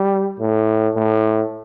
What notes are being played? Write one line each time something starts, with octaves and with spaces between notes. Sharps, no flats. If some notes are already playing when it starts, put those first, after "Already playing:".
Already playing: G3
A2
A2